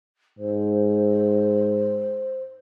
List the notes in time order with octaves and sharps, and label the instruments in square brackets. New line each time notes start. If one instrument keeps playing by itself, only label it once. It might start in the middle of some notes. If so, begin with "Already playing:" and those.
[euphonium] G#2 [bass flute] C5